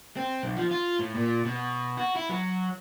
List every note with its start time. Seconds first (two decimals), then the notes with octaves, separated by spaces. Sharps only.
0.17 C4
0.43 B1
0.57 F3
0.71 F4
0.99 A2
1.15 A#2
1.45 B2
1.97 F#4
2.16 E4
2.29 F#3